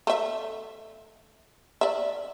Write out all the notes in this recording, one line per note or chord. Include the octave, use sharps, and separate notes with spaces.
A3 E5
D5 E5